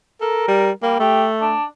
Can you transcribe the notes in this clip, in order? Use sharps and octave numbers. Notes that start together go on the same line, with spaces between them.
A4 A#4
G3
G3 A#3
A3 G4
D4